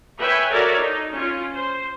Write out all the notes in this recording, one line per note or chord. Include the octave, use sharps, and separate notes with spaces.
B4 C#5 E5 G5 G#5
F#4 A4 A#4 C#5 D5 E5
D#4
C#4 F4
C5